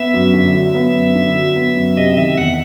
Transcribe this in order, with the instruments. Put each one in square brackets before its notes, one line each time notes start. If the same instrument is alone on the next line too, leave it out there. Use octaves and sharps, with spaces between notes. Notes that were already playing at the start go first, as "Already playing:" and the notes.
Already playing: [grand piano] B3 [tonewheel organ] E5
[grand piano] F#2
D3
F#3
B3
F#2
D3
F#3
B3
F#2
[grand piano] C3 [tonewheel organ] D#5
[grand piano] D#3 [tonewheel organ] E5
[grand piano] E2 [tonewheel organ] F#5